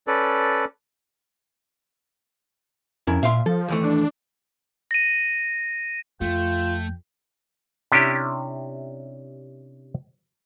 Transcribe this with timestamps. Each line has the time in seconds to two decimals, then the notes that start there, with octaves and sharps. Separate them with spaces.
0.07 C#4 A4 B4 D5
3.07 F2 C#4 E4 A#4
3.23 A#2 E5 F5 C6
3.46 F3 A4
3.68 D#2 E3 A3
3.83 D4
4.91 A#6 D#7
6.21 F2 A3 F4 G5
7.92 C3 C#4 D4 E4 G4